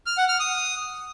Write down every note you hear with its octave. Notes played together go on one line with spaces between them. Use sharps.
F6
F#5
F6
D#6